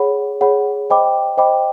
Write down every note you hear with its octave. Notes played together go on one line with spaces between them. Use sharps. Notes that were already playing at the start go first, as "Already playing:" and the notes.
Already playing: G#4 C#5 F#5 B5
G#4 C#5 F#5 B5
C5 D#5 G5 B5 D6
C5 D#5 G5 B5 D6